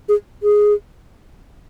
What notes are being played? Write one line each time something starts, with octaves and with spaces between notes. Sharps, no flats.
G#4
G#4